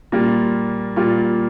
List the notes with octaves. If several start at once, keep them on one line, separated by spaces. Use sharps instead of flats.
A#2 G3 A#3 F4
A#2 G3 A#3 F4